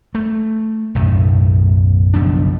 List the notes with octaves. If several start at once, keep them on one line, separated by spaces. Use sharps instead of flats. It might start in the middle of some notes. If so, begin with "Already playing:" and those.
A3
B1 F#2 A2 D#3
F#1 B1 F3 D4